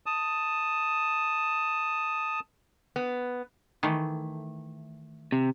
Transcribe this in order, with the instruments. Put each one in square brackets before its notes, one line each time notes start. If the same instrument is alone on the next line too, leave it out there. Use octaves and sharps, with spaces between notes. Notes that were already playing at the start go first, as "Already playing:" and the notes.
[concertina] A5 D#6
[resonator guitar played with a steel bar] B3
[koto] D#3 E3 A3
[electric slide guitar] C3